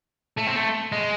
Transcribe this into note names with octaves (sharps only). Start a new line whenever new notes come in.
A3
C4
A3
G#3